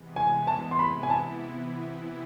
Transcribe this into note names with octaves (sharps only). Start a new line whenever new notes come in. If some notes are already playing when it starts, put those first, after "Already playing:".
Already playing: C3 E3 G#3 B3
G#5
A5
C6
C3 E3 B3 E4 B5
G#5
A5